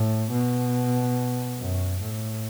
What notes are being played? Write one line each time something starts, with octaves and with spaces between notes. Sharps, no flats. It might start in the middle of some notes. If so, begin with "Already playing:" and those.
Already playing: A2
B2
F#2
A2